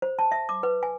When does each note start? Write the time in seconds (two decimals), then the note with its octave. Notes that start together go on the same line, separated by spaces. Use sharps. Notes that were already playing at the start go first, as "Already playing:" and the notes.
0.02 C5
0.19 A5
0.32 E5
0.49 D6
0.63 B4
0.83 G#5